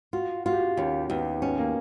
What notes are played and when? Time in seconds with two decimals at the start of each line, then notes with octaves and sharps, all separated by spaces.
0.13 F4 F#4
0.46 F4 F#4
0.52 G4
0.59 F#4
0.77 D#2 C#4
1.10 D#2 B3
1.42 B3 C#4
1.58 A#3